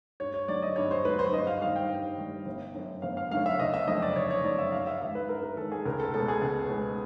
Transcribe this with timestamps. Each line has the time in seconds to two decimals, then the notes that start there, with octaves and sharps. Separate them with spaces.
0.20 G2 C#5
0.34 C#5
0.48 D3 F#3 D5
0.62 D#5
0.76 G2 C#5
0.91 C5
1.05 D3 F#3 B4
1.19 C5
1.33 G2 D#5
1.47 F5
1.61 D#3 G3 F5
1.76 G5
1.90 G2
2.18 D#3 G3
2.46 G1
2.74 F#2 D3 F#3
3.02 G1 F5
3.17 F5
3.31 F#2 D3 F#3 F5
3.46 E5
3.59 F#1 D#5
3.74 E5
3.87 F2 D3 F#3 D#5
4.02 D5
4.16 F#1 C#5
4.30 C#5
4.44 F2 D3 F#3 D5
4.59 E5
4.72 G2 F5
4.87 E5
5.01 D#3 G#3 E5
5.15 B4
5.29 G2 A#4
5.43 A#4
5.57 D#3 G#3 A4
5.72 G#4
5.86 C#2 A#4
6.00 A4
6.14 B2 G#3 B3 A4
6.28 G#4
6.42 C#2
6.70 B2 G#3 B3